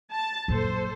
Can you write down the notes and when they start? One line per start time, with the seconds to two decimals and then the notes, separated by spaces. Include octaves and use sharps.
0.11 A5
0.48 A#1 F#2 A4 C5